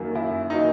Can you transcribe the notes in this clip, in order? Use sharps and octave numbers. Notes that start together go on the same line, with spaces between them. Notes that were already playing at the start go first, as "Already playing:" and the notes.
Already playing: F#2 D#3 F#3 A#3
F#2 E4
D#3 F#3 A#3 D#4